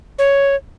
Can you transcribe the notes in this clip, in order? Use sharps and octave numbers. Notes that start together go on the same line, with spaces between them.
C#5